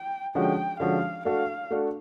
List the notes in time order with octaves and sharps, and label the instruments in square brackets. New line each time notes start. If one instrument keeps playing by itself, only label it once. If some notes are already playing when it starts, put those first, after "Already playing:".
Already playing: [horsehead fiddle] G5
[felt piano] D3 F3 G#3 C#4 F#4 [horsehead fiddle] G5
[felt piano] D3 F3 G#3 C#4 F#4 [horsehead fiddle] F5
[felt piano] A3 D4 F#4 A4 [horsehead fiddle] F5
[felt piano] A3 D4 F#4 A4